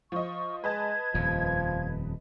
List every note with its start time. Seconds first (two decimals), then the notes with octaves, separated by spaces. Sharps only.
0.12 F3 D#5 C#6
0.64 G#3 B4 D#5 A5 G#6
1.14 D#1 F2 F3